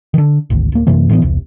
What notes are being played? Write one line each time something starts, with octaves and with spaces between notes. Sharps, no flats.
D3 D#3
G#1 D2
D1 A#3
F#2 C3 E3 A#3
A2 E3 G3 B3
E1 C2